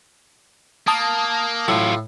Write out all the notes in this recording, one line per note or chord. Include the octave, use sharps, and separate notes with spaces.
A#3 A5 D#6
A2 F#3 F4